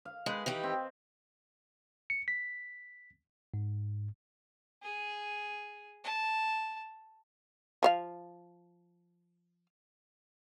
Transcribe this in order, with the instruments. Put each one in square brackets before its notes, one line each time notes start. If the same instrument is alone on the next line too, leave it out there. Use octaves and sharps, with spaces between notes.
[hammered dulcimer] F5
[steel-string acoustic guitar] G#3 [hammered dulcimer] D#4 B4
[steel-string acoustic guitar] D#3 E3 G4
[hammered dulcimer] C4
[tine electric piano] C#7
B6
G#2
[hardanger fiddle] G#4
A5
[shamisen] F3 C#5 F5